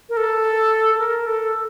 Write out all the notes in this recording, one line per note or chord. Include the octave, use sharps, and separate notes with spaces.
A#4
A4
A4
A#4
A4